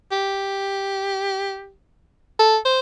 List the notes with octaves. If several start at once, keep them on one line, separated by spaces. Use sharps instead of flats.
G4
A4
C5